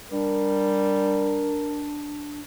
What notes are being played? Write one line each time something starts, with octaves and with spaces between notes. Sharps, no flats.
G3 D4 A#4